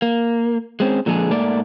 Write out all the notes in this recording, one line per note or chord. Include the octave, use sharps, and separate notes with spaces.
A#3
G#3 C4 C#4
A#2 D3 F3 G#3 G#4
G#2 A3 A#3 D5